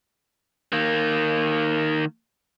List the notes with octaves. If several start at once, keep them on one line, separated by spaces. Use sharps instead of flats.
D#3 A#3